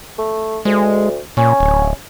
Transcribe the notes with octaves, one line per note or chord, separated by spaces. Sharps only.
A3
D2 G#3
A#2 C#4
D1